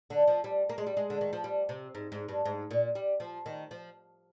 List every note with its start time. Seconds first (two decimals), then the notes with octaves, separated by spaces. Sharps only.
0.10 D3
0.28 F3
0.44 G3
0.69 A#3
0.78 G#3
0.87 G3
0.97 G#3
1.10 D3
1.21 D#3
1.33 F3
1.44 G3
1.69 C3
1.95 G#2
2.12 G#2
2.29 G2
2.45 G#2
2.71 A#2
2.95 G3
3.20 F3
3.46 D#3
3.71 F3